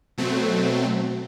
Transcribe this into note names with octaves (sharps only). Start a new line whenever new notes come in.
B2 F#3 A3 C4